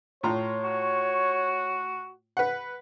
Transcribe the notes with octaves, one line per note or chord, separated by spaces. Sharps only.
A2 F4 C#5 A#5
F#4
B4 F#5